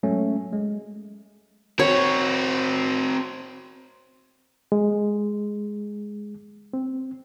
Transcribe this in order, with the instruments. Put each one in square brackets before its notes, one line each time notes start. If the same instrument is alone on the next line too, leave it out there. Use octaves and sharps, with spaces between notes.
[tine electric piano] F#3 G#3 A3 C#4
G#3
[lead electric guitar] C4 F#4 [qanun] C#5
[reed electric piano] G#3
C4